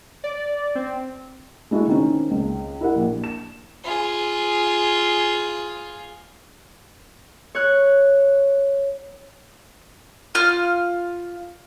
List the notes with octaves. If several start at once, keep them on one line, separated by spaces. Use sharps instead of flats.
D5
C4
G#3 A3 D4 E4 F#4 G#4
D#3 C4 C#4
C#2
E4 G4 A#4 F#5
A#1
E7
F4 G#4
C#5 F#6
F4 F6